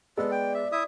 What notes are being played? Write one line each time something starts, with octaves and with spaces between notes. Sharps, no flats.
G#3 B3 A4 D5
G5
E5
E4 E5 D#6